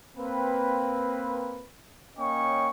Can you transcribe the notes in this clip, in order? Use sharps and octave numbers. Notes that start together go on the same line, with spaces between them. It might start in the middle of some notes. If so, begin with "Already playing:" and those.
A#3 C4 B4
A#3 C#4 C#5 D#5 G5 C#6